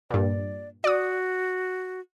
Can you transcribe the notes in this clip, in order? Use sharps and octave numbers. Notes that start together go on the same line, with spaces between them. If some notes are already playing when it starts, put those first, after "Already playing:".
G2 A#2 D5
F#4 D5 D#6